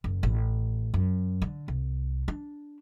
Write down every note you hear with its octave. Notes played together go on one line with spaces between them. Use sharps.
F#1
A1
F#2
D3
C2
D4